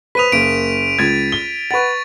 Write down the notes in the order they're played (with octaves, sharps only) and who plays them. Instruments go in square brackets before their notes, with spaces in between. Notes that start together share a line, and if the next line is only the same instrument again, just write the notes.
[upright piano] B4 C5 D#6 [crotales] B6 D#7 F7
[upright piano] F#1 A#3 [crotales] D7
[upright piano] C#2 G#6 [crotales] A6 D7 D#7
[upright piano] G7
[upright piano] B4 F#5 [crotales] C#6 A6